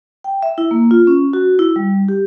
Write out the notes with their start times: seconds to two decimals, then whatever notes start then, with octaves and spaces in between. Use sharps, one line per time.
0.24 G5
0.43 E5
0.58 E4
0.71 A#3
0.91 F4
1.07 C#4
1.33 F#4
1.59 E4
1.76 G3
2.09 G4